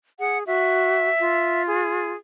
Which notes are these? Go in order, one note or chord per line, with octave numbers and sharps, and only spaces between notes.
G#4 F#5
F#4 E5
F4
G#4